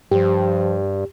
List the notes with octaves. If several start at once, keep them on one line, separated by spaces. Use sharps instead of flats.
G2 F3 G4